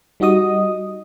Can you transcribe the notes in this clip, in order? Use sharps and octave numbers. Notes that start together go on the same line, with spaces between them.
G3 D#4 F#4 D#5 D#6